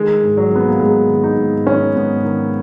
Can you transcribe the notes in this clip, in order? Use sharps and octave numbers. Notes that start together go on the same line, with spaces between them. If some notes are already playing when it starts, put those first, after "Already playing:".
Already playing: D#3 G#3
G#2
F#3
D#3 B3
A#3
G#2 G#3
D#3
D#4
G#2
D#3 C#4
G#2 B3
D#3